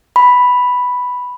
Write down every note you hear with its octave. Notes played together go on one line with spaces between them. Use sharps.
B5